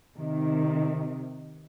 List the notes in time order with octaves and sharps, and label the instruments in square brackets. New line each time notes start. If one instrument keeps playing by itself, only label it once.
[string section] C3 D#3